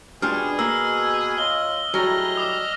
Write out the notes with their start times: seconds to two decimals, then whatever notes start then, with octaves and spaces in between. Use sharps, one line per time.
0.22 B2 G3 D4 F4 G#4 F6
0.59 A#3 E6
1.38 F4 C#5 D#5 G7
1.94 A2 F#3 G3 D#4 G#4 D#5 F6
2.37 D6 D#6